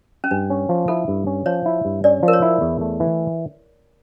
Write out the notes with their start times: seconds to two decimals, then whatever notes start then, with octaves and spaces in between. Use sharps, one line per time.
0.24 C#4
0.31 G2 D4
0.50 C#4
0.69 F3
0.88 E4 A4
1.08 G2
1.27 C#4
1.46 F3 C#5
1.66 E4
1.85 G2
2.04 C#4 D5
2.23 F3
2.28 A#4
2.33 C#5
2.42 E4
2.61 E2
2.81 A3
3.00 E3